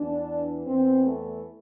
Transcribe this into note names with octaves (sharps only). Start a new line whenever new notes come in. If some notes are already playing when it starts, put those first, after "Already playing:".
Already playing: E2 E3 D4
E2 E3 C4
A3